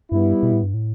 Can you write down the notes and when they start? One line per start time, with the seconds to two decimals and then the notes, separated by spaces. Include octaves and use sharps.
0.11 G2 G3 B3 E4
0.43 B2
0.52 A2
0.63 G2
0.74 A2